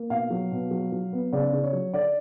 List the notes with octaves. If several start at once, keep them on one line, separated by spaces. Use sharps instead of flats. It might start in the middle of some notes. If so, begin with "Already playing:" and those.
Already playing: A#3
B2 F5
F#3
B2
F#3
F#3
B3
C#3 D5
C#3
C#5
F#3
D3 D5